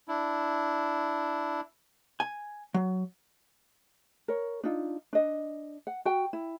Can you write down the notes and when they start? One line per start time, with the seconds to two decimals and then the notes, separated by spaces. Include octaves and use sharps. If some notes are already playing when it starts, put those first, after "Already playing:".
0.08 D4 E4
2.20 G#5
2.74 F#3
4.28 A#4 C#5
4.63 D4 D#4 F4
5.13 D4 D#5
5.87 F#5
6.05 F#4 G5
6.33 E4